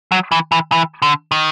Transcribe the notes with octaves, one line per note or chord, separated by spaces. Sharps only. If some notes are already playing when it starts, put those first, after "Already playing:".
F#3
E3
E3
E3
D3
D#3